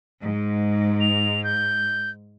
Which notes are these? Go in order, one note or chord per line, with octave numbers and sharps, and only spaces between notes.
G#2
F7
G6